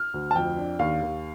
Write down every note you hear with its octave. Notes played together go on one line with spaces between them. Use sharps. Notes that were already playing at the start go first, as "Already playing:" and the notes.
Already playing: F6
D2
A5
F2 G5
D4
D#2 F5
D#2